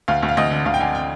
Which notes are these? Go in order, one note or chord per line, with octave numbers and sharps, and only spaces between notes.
D2 F5
D2
F5
D2 D#5
D3
D2 F5
G5
D3 G#5
G5